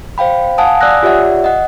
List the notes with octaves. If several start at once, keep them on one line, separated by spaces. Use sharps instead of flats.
C5 F5 G5 B5
F5 F#5 G#5 A5 D#6
D5 G#5 D#6 E6 F#6 A#6
F4 G4 C#5 D5 E5 F#5
D#5 F#5